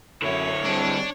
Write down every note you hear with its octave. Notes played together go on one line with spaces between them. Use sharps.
F#2 D3 E4 C#5
G3 G#3 C4 D4